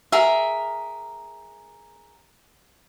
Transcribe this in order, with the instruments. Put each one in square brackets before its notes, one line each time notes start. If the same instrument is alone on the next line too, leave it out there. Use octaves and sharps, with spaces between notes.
[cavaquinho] G#4 A#4 E5